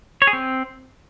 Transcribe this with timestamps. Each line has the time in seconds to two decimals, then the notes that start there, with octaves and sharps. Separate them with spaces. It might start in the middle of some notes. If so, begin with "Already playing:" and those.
0.22 C#5
0.27 G#4
0.33 C4